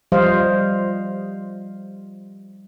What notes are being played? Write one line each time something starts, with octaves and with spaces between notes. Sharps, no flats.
F3 G3 C5 D#5 F5